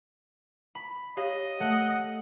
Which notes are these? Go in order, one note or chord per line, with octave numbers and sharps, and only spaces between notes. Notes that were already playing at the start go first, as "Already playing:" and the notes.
B5
G4 C#5 D#5 F5
A3 F#5